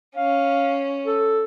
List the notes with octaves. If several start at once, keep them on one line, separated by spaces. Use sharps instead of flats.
C#4 F5
A4